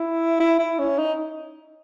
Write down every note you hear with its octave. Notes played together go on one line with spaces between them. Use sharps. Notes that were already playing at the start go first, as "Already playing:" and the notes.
Already playing: E4
E4
E4
C#4
D#4